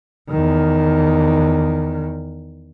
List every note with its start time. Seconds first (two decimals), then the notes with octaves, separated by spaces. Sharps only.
0.30 E2 D#3